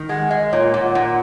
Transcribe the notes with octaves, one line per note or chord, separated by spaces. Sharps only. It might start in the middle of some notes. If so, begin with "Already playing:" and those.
Already playing: D#3
G#3 F#5
G#3 D#5
A#2 C#5
A#2
F#5
A#2